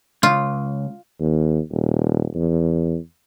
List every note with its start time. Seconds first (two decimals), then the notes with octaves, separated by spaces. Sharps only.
0.23 C#2 F4
1.19 D#2
1.71 D#1
2.35 E2